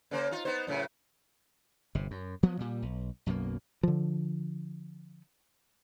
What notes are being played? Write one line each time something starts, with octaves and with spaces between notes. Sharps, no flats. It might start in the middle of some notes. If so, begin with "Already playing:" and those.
C#3 A#3 C5
D#4 F4
B3 D#4 C5
F#2 A2 C#3
G1 C3
F#2
F3 F#3 B3
A#2 G3
B1
B1 F#2 B2 A#3
D3 F3